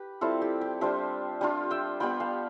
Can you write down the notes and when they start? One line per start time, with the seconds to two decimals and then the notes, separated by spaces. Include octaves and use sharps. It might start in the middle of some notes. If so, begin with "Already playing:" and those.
Already playing: G4 B4
0.21 G3 C4 E4 F4 A4
0.42 G4
0.61 G4
0.81 G3 D4 F4 C5 E5
1.41 G3 D4 F4
1.71 E5 G5
2.00 G3 B3 F4 G5 B5
2.20 F5 A5